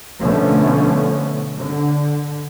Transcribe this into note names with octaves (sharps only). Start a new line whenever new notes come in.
B2 D3 F3 A3 B3 C#4
D3